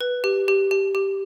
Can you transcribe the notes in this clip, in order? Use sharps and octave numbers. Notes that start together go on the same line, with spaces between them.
B4
G4
G4
G4
G4